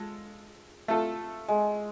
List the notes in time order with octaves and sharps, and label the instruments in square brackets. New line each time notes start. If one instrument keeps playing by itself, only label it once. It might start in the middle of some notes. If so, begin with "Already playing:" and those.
Already playing: [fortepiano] G#3 F4 A4
A3 F4 A4
[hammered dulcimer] G#3